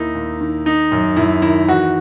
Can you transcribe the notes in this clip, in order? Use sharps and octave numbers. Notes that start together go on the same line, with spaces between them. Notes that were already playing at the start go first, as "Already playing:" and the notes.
Already playing: D#2 D#3 D#4 E4
D#2
D#3
D#3 D#4
F#2
F#2 E4
D#3 E4
E3 F#4